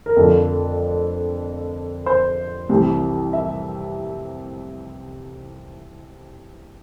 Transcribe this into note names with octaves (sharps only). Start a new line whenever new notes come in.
A#4
F2 D3 F3 A4
C5
C2 C3 E3
E5